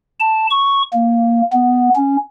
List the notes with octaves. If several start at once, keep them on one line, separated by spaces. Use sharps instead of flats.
A5
C#6
A#3
B3
C#4